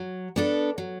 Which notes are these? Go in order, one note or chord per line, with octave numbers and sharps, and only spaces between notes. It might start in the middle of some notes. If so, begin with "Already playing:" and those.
Already playing: F#3
B3 D4 A4
F#3